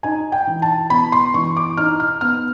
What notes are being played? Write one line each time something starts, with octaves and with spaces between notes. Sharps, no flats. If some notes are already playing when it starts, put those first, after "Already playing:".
D#4 G#5
G5
E3
A5
B3 B5
C6
E3 C#6
D6
D#4 F6
F6
B3 F6